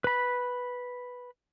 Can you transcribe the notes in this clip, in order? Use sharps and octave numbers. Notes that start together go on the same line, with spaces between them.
B4 B5